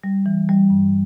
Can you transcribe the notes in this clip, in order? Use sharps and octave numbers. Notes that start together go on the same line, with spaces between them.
G3
E3
G3
G2